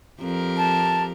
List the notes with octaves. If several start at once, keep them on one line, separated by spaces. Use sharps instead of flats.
F2 G4 A#4
A5